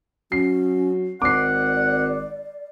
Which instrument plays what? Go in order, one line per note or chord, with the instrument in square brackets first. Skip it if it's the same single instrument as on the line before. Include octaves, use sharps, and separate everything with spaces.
[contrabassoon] F#3 [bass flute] C#4 [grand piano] C7
[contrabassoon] G#1 [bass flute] D5 [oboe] F#5 [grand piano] D6 C7